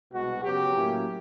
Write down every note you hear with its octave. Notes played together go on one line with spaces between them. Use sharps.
C2 B2 G#3 F#4
F#2 C#3 F#3 B3 G4
A2 F#3 A#3 C#4 E4